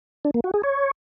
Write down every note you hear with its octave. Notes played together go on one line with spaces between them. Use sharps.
D4
A#3
F#4
G#4
C#5